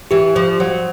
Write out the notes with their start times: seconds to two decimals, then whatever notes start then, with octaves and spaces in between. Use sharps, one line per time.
0.11 E3 G4
0.36 F3 C5
0.60 F#3 C5